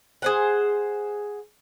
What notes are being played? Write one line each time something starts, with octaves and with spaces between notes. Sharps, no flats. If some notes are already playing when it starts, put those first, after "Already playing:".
G#4 C5 F#5